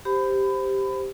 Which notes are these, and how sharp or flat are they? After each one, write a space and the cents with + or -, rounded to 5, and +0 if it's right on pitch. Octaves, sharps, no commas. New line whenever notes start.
G4 +0 C5 -5 B5 +25